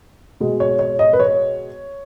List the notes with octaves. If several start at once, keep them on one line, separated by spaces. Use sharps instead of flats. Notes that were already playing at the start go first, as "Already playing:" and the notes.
B2 G#3
C#5
C#5
D#5
B4
C#5